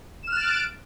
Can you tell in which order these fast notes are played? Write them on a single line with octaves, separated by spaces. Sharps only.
E7 F6 F#6 A6 D7